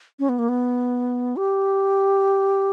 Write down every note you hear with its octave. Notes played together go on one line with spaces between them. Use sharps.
C#4
B3
A#3
B3
G4